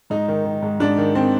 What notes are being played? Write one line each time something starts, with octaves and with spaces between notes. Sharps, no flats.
G#2 D#4
D#3
D#3
G#2
G#2 D4
D#3
D#3 C4